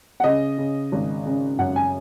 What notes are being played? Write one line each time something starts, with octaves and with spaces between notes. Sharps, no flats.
F#5
C#3 D#5
C#3
G#1
C#3
F#2 F#5
G#5